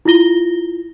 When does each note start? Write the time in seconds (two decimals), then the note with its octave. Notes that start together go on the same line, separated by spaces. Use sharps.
0.05 E4 F4 A#6 G7